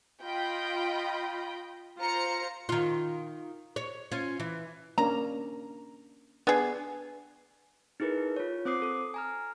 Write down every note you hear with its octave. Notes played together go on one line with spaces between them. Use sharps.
F4 D#5 G5 B5
F4 C5 A#5 C#7
D#3 F4
C#5
C#4 F4
E3
A#3 C#4 D4 A#5
B3 D4 G#4
D#4 E4 G#4 A#4 B4
F4 C#5
C4 C5 D6 D#6 C7
A4 D#6
G#5 A#5 F6